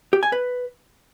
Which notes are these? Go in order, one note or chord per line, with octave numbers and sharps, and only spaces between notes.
G4
G#5
B4